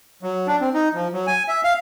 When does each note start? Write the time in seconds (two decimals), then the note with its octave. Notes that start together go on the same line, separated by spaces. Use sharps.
0.23 F#3
0.47 D4
0.61 C4
0.74 D#4
0.94 F3
1.13 F#3
1.27 G#5
1.48 E5
1.64 F5